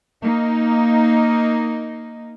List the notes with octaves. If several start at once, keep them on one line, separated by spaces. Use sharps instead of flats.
A#3 D#4